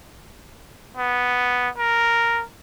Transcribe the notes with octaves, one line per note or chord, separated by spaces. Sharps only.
B3
A#4